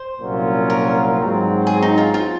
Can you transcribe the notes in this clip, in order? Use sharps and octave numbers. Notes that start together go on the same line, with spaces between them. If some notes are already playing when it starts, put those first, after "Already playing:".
Already playing: C5
C2 A#2 F#3 C#4 F4
A#4
G#2 F#3 C4
G#4
D#4
F4
F4